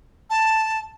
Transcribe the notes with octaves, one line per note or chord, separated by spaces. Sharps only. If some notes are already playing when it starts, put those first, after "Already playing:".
A5